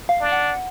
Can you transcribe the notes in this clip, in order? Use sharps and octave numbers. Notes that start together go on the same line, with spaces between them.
F5
D4
F#5